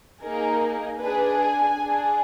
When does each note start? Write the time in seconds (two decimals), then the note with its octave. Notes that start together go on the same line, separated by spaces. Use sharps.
0.21 A#3 D#4 G#4 A#4
0.99 D4 G#4 B4
1.38 G#5
1.77 D4 G#4